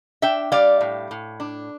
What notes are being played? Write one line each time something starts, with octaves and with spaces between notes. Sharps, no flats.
D4 E5 G5
G3 D5 F5
A2
A2
D4